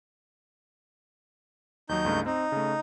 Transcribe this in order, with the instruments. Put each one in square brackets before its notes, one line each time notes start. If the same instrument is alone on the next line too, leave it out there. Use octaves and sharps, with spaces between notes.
[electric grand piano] D#2 F#3 [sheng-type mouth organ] D#4 G6
[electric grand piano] C#2 G2 A3
[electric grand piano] C4 [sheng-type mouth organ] D#4
[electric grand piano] C#3 A3